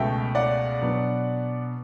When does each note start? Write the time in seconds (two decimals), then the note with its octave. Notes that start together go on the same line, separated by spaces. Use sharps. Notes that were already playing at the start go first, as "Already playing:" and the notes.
Already playing: C#2 B2 A3 E5 G5
0.35 D5 F#5
0.82 B2 F#3 B3 D4